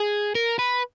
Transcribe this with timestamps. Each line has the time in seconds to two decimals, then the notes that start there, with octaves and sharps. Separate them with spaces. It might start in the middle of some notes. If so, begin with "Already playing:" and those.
Already playing: G#4
0.35 A#4
0.59 B4